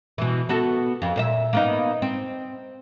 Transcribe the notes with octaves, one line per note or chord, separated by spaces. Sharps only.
B2 E3
B3 F#4 A4
F2
A#2 C5 E5
A#3 B3 D#4
C4